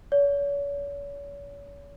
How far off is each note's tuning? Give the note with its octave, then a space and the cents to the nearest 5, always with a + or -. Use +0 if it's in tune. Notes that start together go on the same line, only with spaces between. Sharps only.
C#5 +40